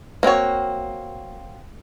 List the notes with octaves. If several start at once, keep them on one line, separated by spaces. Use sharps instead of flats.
A#3 C4 F#4 C#5